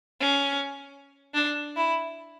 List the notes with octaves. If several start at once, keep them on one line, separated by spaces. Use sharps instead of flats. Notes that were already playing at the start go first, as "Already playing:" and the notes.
C#4
D4
E4